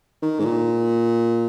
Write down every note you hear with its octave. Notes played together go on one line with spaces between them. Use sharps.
D#3
G#2
A#2